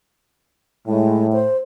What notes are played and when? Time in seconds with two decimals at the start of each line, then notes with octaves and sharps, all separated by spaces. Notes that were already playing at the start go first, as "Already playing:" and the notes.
0.87 A2 G#3
1.33 C5